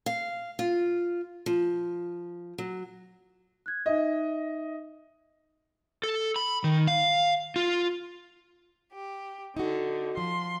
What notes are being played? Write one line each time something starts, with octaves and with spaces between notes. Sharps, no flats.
F5
F4
F3
F#3
F#6 G#6
D#4 D#5 E5
A4
B5
D#3
F5
F4
G4
D3 D#4 F#4
F3 C6